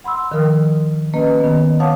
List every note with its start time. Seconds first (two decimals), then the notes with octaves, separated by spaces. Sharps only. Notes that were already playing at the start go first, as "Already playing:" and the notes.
0.04 F#5 B5 C6 E6
0.32 D#3 F3 A#4 D#6 F6
1.14 A#3 C#4 B4 D#5
1.40 D#3 B3
1.80 C#5 F5 F#5 A5 D6 D#6